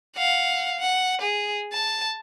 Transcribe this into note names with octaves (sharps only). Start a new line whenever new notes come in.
F5 F#5
F#5
G#4
A5